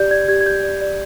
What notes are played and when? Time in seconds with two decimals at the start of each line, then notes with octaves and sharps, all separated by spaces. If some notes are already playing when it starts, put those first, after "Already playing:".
Already playing: G4 D5 G6
0.11 D5 G#6
0.28 G4 G#6
0.41 G#6
0.46 G4 G6
0.63 D5
0.81 D5